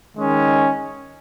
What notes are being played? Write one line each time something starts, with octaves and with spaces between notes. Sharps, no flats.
D#3 G#3 C#4